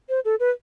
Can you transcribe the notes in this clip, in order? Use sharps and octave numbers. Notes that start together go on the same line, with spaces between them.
C5
A4
B4